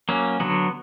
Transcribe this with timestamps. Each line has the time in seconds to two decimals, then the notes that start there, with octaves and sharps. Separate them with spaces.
0.09 F#3 A#3 C#4
0.40 D3 F#3 B3